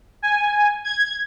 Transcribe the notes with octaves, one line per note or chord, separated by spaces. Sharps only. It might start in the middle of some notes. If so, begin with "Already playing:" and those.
G#5
G#6